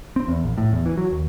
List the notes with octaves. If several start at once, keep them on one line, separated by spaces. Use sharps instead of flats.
C4
E2
A#1
A2
E2
E3
F#3
D#2